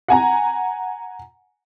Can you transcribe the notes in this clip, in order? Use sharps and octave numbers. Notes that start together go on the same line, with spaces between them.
F#5 G#5 A#5